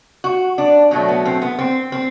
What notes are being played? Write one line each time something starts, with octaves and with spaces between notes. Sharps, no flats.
F#4
D4
B2 F#3 A3 C4
B3
C4
B3
C4
C4